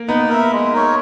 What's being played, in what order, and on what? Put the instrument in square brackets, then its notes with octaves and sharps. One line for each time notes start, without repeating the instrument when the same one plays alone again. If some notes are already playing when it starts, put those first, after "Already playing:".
Already playing: [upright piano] A#3
[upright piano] B3 [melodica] D#4
[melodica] A#4 E5
G#3
D#4 A#4 C#5